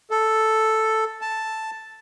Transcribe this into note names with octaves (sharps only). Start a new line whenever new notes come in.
A4
A5